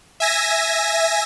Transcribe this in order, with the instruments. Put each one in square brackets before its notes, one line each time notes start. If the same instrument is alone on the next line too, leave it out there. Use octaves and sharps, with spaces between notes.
[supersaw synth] E5 G#5 A#6